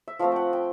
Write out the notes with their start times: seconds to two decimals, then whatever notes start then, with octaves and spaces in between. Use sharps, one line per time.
0.08 E5
0.19 F3 A3 C4 F5
0.32 F#5 G5
0.53 G5